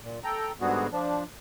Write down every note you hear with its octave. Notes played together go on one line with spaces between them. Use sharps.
A#2
A4 G5 A#5
G#2 D3 G3 B3 F#4 G#4
F3 D4